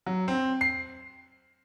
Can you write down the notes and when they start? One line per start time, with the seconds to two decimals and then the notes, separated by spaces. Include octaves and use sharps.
0.06 F#3
0.28 C4
0.61 C7